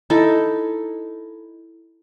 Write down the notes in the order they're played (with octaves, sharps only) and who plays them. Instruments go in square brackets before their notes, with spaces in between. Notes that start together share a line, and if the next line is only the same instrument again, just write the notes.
[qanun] D#4 E4 A4